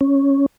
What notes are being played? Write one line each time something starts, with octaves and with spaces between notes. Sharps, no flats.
C#4